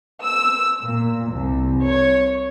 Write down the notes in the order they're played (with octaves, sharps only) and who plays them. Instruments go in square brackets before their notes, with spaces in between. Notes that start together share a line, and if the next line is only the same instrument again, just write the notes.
[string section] E6
A#2
C2
C#5